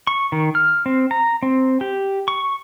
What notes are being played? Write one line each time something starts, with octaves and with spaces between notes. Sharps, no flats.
C#6
D#3
F6
C4
A#5
C4
G4
C#6